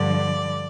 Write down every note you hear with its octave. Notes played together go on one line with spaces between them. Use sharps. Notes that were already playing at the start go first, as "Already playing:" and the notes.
Already playing: G2 D3 F3 D5